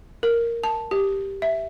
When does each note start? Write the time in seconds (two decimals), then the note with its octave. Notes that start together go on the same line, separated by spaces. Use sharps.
0.23 A#4
0.64 A5
0.91 G4
1.42 E5